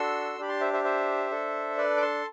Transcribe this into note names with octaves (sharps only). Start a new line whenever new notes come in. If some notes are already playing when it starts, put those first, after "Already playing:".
Already playing: D4 F#4 A4 C6 E6
D4 G4 B5
A5 C6
C5 E5
C5 E5
C5 E5
D4 A4
B4 D5
D6
A5 C6